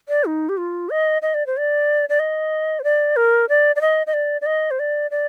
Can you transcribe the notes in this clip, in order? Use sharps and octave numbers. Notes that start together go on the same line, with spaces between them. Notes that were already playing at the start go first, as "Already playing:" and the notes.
D5
D#4
G4
F4
D#5
D#5
D5
C5
D5
D5
D#5
C5
D5
A#4
D5
D5
D#5
D#5
D5
D5
D#5
C5
D5
D5